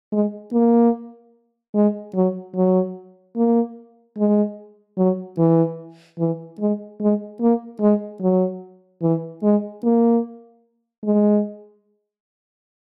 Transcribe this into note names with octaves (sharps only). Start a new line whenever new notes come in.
G#3
A#3
G#3
F#3
F#3
A#3
G#3
F#3
E3
E3
G#3
G#3
A#3
G#3
F#3
E3
G#3
A#3
G#3